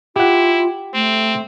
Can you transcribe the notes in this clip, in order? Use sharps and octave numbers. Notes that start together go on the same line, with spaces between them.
E4 F4 G4 F#5
A3 C4